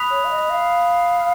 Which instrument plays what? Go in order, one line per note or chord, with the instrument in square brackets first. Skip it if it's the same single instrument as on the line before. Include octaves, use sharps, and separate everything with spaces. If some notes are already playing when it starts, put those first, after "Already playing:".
Already playing: [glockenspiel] B5 D#6 F#6 B6 F7
[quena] C#5
F5
D#5
F5